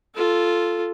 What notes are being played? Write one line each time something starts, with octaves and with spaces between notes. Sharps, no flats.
F4 A4